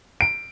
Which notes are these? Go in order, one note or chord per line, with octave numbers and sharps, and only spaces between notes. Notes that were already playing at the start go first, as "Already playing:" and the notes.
D7